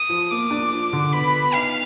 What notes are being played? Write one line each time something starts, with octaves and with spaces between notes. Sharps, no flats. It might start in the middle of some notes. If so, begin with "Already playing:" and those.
Already playing: D#6
F3
A#3 D6
D4
F3
D3
B3 B5
B3
D#4 F5